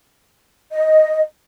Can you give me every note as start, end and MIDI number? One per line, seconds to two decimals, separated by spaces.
0.72 1.21 75